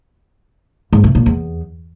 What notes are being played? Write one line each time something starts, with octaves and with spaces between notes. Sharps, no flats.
G#2
C3
A#2
E2